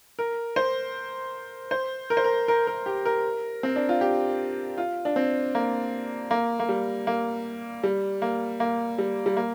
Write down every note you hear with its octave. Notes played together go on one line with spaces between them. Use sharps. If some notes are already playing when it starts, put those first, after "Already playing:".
A#4
C5
C5
A#4
C5
A#4
A#4
A#4
G4
A#4
C4
D4
F4
G4
F4
D4
C4
A#3
A#3
A#3
G3
A#3
G3
A#3
A#3
G3
G3
A#3